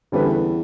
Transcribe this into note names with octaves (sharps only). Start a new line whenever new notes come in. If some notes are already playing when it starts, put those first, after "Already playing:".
E2 D3 G3 C#4 E4 B4